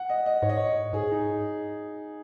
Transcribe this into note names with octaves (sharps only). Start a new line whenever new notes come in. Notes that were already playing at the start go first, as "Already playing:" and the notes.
Already playing: F#5
D#5
D#5
G#2 C#5
D#5
C#5
G#2 G#4
D#4